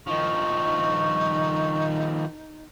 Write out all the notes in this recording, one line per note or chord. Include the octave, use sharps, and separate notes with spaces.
D#3 F3 D#4 C#6